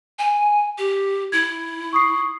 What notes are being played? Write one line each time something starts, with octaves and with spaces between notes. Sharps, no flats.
G#5
G4
E4 G#6
C#6 D#6 C7